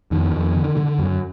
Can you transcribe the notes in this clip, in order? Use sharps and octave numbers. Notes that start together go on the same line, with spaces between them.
F2 D#3
F2
D3
D3
F#2